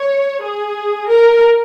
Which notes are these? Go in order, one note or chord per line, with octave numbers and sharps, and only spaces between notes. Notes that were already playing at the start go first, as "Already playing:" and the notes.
Already playing: C#5
G#4
A#4